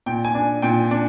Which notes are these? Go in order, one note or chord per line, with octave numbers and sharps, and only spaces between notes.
A#2 G5
G#5
D4
A#2 G5
D4